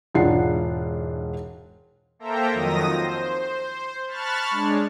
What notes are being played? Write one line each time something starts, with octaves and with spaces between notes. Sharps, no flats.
E1 G#2 D4 F4 F#5 C7
A#3 A4 C5 E5 G5 A#5
F2 D#3 F3 F#3 D#6 A#6
C5
A5 B5 C#6 F6 F#6 A6
G#3 D4 C#5